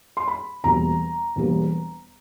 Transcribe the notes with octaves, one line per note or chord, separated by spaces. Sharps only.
C6
B5
E1 E2 B2 G3 A#3 A#5
E1 E2 B2 G3 A#3